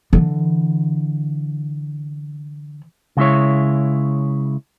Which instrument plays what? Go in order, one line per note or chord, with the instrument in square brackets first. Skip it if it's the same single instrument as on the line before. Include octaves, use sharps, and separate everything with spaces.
[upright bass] D3 E3
[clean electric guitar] C#3 G#3 E4 C#5